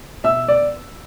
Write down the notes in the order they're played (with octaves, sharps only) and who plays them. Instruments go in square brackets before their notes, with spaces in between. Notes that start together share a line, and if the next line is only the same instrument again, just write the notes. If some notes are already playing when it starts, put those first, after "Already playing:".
[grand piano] B2 E5 E6
B3 D5